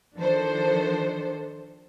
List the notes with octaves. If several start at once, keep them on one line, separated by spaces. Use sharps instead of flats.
D#3 F3 D4 A4 C5